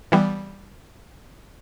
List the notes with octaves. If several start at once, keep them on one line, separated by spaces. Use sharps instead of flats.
E3 G3 B3